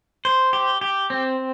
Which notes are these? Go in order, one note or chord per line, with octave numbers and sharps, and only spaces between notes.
C5
G4
G4
C4